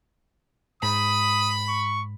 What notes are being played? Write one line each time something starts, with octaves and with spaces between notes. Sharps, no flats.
G#2 B5 D#6
C#6